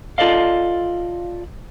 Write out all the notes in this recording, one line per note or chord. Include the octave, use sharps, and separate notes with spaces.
F4 A4 D5 D#5 F5